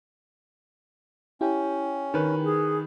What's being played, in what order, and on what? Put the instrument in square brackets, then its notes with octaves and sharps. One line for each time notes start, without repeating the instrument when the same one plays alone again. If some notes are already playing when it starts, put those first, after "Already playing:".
[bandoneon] C#4 [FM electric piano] E4 G4 G5
[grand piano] D#3 B4
[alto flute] G#4